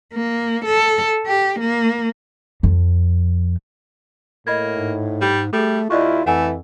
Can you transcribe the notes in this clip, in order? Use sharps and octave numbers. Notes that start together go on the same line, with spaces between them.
A#3
A4
G4
A#3
F2
A2 A#3 D#5 B5 G#6
G#2
G3
G3 A3 G#4 A4
D#2 E4 F4 D5 D#5 C#6
F2 E3 A3 F#5 G#5 E6